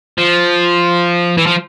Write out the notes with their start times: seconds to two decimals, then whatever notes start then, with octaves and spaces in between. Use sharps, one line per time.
0.18 F3
1.37 E3
1.46 F3